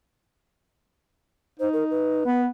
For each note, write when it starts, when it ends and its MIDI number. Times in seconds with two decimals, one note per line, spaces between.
1.60 2.20 63
1.60 1.69 72
1.73 1.84 70
1.91 2.41 71
2.25 2.47 59